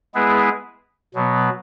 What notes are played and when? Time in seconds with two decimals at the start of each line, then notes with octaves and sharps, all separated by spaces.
0.14 G#3 B3 E4 G#4 B4
1.14 B2 F#3 B3